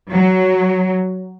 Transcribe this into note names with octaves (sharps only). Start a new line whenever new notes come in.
F#3